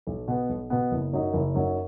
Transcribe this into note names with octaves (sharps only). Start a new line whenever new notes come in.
B1
B2 B3
B1
B2 B3
F#1
F#2 F#3 D#4
F#1
F#2 F#3 D#4